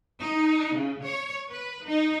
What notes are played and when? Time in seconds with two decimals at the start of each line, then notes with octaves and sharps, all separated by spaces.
0.20 D#4
0.73 C#3
1.03 C#5
1.51 B4
1.86 D#4